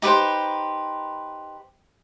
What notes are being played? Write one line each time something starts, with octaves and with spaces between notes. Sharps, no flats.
D#4 G4 B4 C5